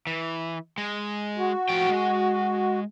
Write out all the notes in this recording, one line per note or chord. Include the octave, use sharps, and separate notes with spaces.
E3
G#3
F#4
A2 F3 G5
G#3